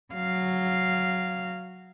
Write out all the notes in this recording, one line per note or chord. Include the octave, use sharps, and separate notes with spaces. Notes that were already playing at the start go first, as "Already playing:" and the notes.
F#3 F5